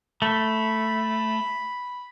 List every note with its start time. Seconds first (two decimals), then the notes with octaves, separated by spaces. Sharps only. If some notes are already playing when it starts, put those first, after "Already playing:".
0.22 A3 B5